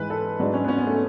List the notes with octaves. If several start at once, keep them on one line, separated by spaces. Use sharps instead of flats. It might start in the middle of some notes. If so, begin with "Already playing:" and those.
Already playing: G#2 E3 B4
A4
G#2 F#3 D4
C#4
B3
C#4
B3
A3